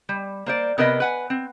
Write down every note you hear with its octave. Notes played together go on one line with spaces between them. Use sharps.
G3
A#3 C5 D5
C3 B3 A#4 B4 D#5
B4 F#5 G#5
C4